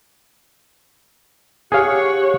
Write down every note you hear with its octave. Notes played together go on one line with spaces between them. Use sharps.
G4 G#4 C#5 F5 F#5